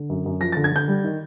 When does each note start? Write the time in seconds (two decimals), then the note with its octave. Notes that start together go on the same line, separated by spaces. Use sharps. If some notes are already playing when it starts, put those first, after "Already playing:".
Already playing: D3
0.10 F#2
0.26 F#2
0.41 F3 A#6
0.52 D3 A6
0.64 G#6
0.72 D3 G6
0.88 G3
1.04 D#3